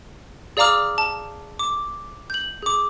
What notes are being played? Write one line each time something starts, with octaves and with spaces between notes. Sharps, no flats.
G#4 D5 F5 A#5 D6 F6
A5
D6
G6 F#7
G#4 D6